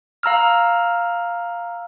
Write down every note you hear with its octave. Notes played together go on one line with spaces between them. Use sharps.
F5 A#5 E6 F6